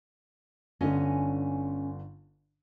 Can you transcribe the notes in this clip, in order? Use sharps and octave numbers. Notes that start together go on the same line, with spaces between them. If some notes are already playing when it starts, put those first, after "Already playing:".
G1 D3 C#4 D#5 G#5